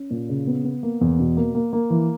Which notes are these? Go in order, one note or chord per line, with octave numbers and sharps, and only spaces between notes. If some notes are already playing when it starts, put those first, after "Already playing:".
Already playing: C#4
A#2
C#3
B3
B3
A#3
E2
B2
A#3
A#3
A#3
E3